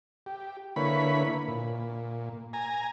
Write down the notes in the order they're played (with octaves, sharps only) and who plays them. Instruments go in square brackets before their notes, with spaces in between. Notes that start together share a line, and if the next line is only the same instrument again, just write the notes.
[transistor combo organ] G4
D3 A#3 E4 B4 C#5 B5
A#2
G#5 A#5